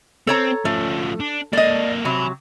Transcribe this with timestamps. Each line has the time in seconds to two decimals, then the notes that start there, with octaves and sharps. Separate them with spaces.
0.27 C4 A4 C#5 A#5
0.65 F3 A3 C#4
1.20 D4
1.53 A#3 A4 D5 D#5
2.05 C3 F#3 G#5 B5